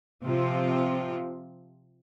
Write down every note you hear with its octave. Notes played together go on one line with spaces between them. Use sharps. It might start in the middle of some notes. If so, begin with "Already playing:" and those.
C3 F3 C4 F4